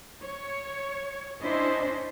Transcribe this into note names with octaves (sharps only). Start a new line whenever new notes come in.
C#5
C#4 D4 E4 C5 D#5